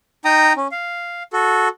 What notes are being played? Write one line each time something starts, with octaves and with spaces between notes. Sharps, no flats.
D#4 G5 A#5 D#6
C#4
F5
F#4 A4